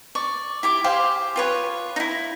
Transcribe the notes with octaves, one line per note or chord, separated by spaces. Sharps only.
D5 C#6
E4 G4 D6
G4 G#4 C5 F5
F4 B4 C#5
D#4 E4